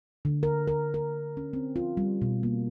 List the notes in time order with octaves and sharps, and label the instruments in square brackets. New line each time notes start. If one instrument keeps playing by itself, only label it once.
[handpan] D3
A#4
A#4
A#4
C#4
C4
F4
G3
B2
A#3